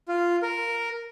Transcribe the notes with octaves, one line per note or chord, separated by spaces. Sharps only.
F4
A#4